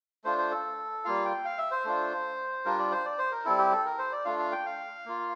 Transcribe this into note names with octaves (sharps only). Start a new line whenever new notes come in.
A3 D4 F4 C5
C5
A4
G3 A#3 F4 F5
G5
F5
E5
C5
A3 D4 F4
G3 D4 F4 A#4
D5
C5
D5
C5
A#4
G3 C4 E4 A4
G4
A4
A#4
C5
D5
A3 D4 F4 F5
F5
G5
F5
A#3 F4